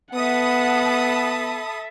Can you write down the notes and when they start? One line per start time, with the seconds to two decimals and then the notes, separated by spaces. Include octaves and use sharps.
0.14 B3 A4 E5 F#5 A5 B5 D#6